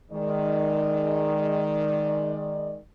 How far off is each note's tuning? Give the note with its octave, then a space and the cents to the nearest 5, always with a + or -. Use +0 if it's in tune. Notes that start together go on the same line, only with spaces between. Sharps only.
D#3 +0 G#3 +0 D5 +15